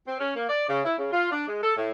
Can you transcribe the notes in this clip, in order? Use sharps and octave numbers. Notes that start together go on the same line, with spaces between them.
C4
C#4
A#3
D5
C#3
E4
C#3
F4
D4
G#3
A4
A2